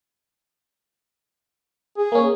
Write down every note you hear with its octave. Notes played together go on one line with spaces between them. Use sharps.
G#4
A#3 C#4